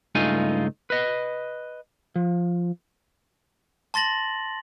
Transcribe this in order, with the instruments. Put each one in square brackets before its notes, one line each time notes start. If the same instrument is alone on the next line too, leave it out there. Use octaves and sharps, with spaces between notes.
[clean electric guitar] C#2 G2 A3 D#4 F4 G#5
B4 D#5
F3
[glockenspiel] A5 C6 A6 A#6 F#7